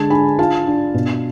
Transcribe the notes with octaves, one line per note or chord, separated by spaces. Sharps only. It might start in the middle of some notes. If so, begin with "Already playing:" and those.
Already playing: D3 G#3 A5
D4 G#5 B5
F4 F5 A5
D4
B2